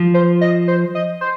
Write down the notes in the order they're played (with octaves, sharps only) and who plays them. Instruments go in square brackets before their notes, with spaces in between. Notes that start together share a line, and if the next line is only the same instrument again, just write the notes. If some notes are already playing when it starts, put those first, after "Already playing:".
Already playing: [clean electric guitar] F3
[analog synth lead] C5
D#5
C5
D#5
C5